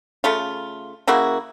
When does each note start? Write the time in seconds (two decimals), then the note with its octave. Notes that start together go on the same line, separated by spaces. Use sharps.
0.24 C#3 A3 F4
1.07 C#3 A#3 E4 F#4